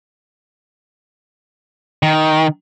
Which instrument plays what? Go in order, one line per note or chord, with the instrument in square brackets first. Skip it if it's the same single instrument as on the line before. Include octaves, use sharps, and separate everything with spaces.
[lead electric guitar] D#3